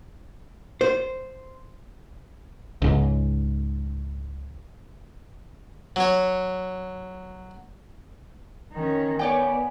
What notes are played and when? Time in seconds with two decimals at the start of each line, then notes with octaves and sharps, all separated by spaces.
0.81 C5
2.82 C#2 G#2
5.96 F#3 C#5
8.73 D#3 C#4
9.19 B3 C#5 D5 G5 G#5